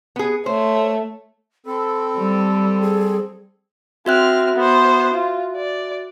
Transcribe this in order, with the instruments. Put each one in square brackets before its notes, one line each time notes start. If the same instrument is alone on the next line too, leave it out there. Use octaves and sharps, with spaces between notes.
[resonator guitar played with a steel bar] B3 G#4
[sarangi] A3 [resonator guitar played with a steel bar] C5 [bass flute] C#5
[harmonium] C4 A4 [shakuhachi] B5
[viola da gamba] G3
[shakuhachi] G#4
[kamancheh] C4 F6 [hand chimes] F#4 E5 F#6
[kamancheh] B3 C5
F4
D5